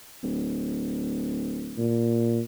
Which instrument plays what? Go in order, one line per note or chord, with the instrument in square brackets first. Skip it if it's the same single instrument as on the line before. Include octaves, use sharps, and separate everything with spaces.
[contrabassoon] D1
[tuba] A#2